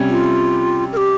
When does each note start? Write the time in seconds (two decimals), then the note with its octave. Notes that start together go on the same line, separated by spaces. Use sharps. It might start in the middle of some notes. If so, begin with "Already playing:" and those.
Already playing: C3 G3 C#4
0.09 F4
0.93 A#4
0.97 G4